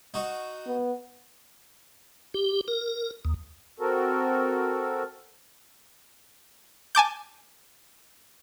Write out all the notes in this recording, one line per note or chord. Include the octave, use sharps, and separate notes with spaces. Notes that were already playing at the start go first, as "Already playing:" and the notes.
D#4 F#4
B3
G4
A#4
D#2
C4 F#4 A4 A#4
G#5 A5 D6 G6